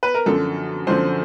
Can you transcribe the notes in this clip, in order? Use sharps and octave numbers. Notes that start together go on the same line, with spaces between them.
B4
A#4
F#2 D3 F3 A4
F#2 D3 F3 C5